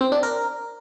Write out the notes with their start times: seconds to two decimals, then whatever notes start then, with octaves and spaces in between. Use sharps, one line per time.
0.01 C4
0.12 D4
0.23 A#4